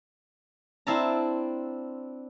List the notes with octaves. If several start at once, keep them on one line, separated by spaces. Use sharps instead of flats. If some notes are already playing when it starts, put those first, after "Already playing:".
C4 D4 E4 F5 A5 A#5